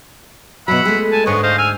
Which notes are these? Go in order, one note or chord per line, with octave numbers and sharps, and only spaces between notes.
B2 F#3 E5 F#5 B5
G#3 A3
G#5 A5
D2 G#2 G#3 B3 C#5
C5 D#5 F5
G#5 E6 F6